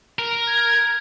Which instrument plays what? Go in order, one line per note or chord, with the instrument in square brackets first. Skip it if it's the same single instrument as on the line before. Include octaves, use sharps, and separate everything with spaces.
[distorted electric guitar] A#4
[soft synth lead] G#6